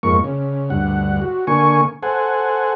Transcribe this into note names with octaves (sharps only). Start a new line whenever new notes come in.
F2 G#2 A#3 C#6
C#3
D2 G2 F#5
F#4
D3 A#3 G#5 C#6
A4 C5 F#5 G#5